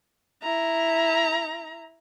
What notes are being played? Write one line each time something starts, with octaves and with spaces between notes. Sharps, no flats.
E4 A#5